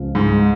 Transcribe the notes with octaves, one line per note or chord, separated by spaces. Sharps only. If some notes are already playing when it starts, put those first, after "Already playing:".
Already playing: C#2 C#3 F3 G#3
G#2